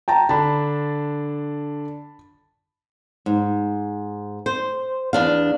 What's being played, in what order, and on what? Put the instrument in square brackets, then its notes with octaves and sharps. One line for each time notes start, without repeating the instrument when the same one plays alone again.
[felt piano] G5 A5 A#5
[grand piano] D3 D4 [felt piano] A5 B5
[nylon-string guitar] G#2
C5
E2 D4 F5